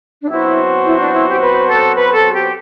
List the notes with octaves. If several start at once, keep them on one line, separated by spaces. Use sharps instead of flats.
D4
B2 F#3 C4 E4 F#4 C5
E4
D4
E4
G4
B4
A4
B4
A4
G4